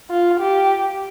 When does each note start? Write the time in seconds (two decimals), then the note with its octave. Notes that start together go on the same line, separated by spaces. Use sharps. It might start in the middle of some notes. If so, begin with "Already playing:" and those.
0.10 F4
0.40 G4